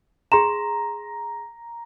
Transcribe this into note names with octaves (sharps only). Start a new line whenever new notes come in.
G#4 A#5 C6 E7